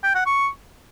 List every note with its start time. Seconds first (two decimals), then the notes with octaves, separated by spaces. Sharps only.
0.03 G5
0.15 F#5
0.26 C#6